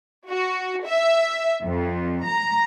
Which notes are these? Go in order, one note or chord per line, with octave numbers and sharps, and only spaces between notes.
F#4
E5
F2
A#5